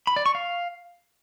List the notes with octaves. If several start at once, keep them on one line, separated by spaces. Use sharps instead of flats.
B5
D5
C#6
F5